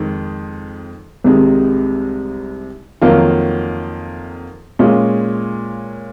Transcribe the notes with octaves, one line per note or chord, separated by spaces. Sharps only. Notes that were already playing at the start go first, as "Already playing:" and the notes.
Already playing: F2 D#3 G#3
C2 C3 D#3 G#3
F2 D#3 F#3 A#3 F4
A#2 G#3 C#4 F4